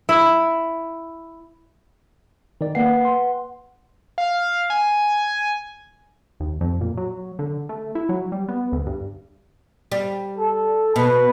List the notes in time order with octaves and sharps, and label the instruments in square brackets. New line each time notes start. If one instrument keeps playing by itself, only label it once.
[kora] E4
[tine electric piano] D#3 D5
[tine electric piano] A#3 C7 [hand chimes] B4 F#5 G5
[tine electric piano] C6
[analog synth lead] F5
G#5
[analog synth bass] D#2
F2
A#2
F#3
D3
A3
E4
F#3
G3
B3
D2
G2
[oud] G3
[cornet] A4
[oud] B2 [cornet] B4